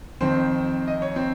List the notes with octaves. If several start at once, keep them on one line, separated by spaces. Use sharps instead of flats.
F2 D#3 C4 C5
D#5
C#5
C4 C5